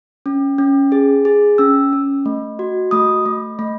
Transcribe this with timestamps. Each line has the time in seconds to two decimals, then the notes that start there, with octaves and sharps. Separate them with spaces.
0.26 C#4
0.58 C#4
0.92 G#4
1.25 G#4
1.58 C#4 E6
1.93 C#4
2.26 A3
2.59 F#4
2.91 A3 D#6
3.25 A3
3.59 A3